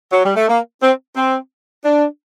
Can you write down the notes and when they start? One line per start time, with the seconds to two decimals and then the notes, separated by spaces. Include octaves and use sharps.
0.11 F#3
0.23 G3
0.36 A3
0.48 A#3
0.81 C4
1.15 C4
1.83 D4